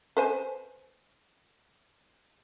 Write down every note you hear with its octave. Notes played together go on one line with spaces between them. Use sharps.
B4 C5 G#5